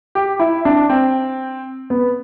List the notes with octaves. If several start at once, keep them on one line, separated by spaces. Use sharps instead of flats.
G4
E4
D4
C4
B3